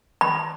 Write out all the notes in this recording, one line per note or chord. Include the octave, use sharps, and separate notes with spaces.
B5